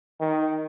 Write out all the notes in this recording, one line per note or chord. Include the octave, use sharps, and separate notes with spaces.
D#3